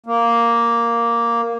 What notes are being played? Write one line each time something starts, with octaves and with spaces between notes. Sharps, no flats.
A#3